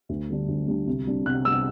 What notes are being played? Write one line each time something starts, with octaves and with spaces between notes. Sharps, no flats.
D2
D3 G3 D4
D2
D3 G3 D4
C2
C3 G3 D4
C2 F#6
C3 G3 D4 E6